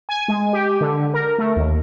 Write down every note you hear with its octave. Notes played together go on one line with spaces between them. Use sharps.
G#5
G#3
G4
D3
A#4
A3
D#2